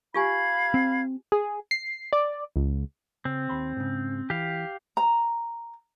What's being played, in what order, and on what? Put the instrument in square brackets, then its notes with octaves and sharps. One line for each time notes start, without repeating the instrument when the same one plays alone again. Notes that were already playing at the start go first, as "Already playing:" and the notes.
[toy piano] F4 G4 G#5 [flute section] F5 B5 G#6
[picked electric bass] C4
[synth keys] G#4
C7
D5
C#2
[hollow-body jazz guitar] C#3 [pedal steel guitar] C4
[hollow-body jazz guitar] D#2 B5 C6
G#2 C#3
[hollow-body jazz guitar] E3 [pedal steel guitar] G4 F5
[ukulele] A#5